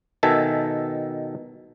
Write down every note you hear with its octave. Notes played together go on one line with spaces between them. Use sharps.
B2 D#3 A4 E5 G#5 A5